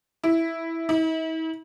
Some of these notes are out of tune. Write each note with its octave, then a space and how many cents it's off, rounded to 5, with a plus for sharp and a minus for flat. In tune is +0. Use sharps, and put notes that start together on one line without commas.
E4 -5
E4 -45